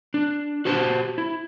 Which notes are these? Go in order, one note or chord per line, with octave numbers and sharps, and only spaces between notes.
D4
F#4 G4 C5 A5
E4